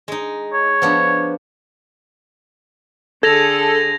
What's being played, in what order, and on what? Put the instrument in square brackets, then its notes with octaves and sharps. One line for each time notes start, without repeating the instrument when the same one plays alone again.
[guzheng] G#3 D#4
[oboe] C#5
[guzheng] F3 B3 D4
[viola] D3 G#4 [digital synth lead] A4 [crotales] G#6 A#6 F7